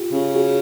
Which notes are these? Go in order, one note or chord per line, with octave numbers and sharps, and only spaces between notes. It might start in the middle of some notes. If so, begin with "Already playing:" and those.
Already playing: F4 G4
C#3
F#4 G#4